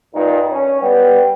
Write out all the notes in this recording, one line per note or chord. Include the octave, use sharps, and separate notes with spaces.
G2 A#2 D#4
C#4
G3 B3 G4